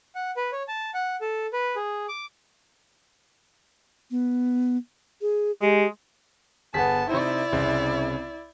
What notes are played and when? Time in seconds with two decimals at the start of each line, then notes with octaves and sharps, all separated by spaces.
0.15 F#5
0.37 B4
0.52 C#5
0.68 A5
0.94 F#5
1.21 A4
1.53 B4
1.76 G#4
2.08 D6
4.11 B3
5.21 G#4
5.62 G#3 G4
6.74 G1 B3 G#4 A5 B6
7.09 C3 D#4 E4 C5 D5
7.52 C2 C#3 C4